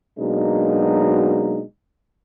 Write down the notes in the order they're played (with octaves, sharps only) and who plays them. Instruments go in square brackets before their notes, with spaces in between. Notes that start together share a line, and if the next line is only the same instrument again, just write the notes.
[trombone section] B2 F#3 G#3 A#3 D4 D#4